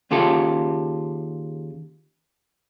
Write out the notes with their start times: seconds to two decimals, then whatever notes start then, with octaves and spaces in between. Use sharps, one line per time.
0.11 D#2 C#3 F4 G4 A4